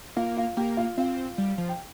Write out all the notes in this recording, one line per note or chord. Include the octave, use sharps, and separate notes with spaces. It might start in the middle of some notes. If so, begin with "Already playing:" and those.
A#3 F4 F5
F4 F5
A#3 G4 G5
F4 F5
C4 F4 F5
G3
F3
G5